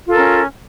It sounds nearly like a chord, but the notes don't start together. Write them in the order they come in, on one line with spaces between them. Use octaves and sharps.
F4 A4 A#4 C#4